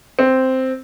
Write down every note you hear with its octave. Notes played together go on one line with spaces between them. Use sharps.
C4